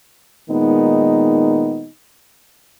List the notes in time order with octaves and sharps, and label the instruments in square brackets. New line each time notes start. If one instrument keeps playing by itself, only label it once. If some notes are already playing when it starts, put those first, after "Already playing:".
[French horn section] A#2 D#3 G#3 B3 D#4